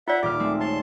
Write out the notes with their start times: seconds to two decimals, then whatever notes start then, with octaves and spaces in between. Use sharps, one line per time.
0.08 F4 D5 E5 F#5
0.23 D#1 F4 D6 F6
0.40 G#3 A3 C4
0.60 C#5 A5 C6